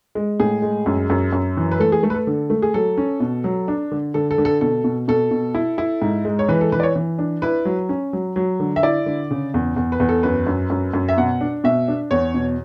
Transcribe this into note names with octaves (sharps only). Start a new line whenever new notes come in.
G#3
A2 G#4
G#3
F#2
F#2
F#2
E3
B4
A3 A4
G#4
A3 A4
B4
A4
D3
A3
G#4
F#3 A4
C#4
B2
F#3
D4
D3
D3 A4
A4
D3
A4
B2 A4
B2
B2 A4
B2
E4
E4
G#2
G#3
C#5
E3 B4
A4
E3 B4
D5
C#5
E3
D4
E4 B4
F#3
C#4
F#3
F#3
D3
E5
E4 D5
D3
C#3
E2
E2
B4
E2
A4
F#2 B4
F#2
F#2
F#2
E5
B2 F#5
D4
B2 E5
D4
E2 C#5
B2